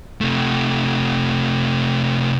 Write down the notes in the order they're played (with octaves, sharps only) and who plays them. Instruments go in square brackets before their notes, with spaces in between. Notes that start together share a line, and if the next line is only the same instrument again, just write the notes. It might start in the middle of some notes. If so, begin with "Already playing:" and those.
[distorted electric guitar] C3 A3